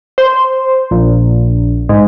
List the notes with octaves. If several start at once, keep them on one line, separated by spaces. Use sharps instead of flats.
C5
A#1
G#2